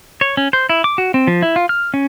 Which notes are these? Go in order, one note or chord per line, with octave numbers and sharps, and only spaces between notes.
C#5
C#4
C5
E4
D6
F#4
C4
F3
E4
F4
F6
C#4